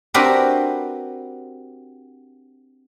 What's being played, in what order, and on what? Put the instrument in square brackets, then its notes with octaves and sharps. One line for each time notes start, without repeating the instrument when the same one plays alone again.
[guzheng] C4 D4 F#4 G4 A#4 B4